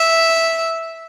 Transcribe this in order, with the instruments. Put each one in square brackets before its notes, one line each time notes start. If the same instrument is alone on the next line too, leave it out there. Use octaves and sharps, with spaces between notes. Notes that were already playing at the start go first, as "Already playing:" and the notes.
Already playing: [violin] E5